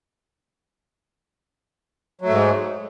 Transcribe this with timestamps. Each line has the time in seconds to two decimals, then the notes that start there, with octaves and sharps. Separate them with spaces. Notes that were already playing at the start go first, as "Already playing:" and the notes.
2.21 F#3
2.25 A3
2.29 G#2
2.33 G#3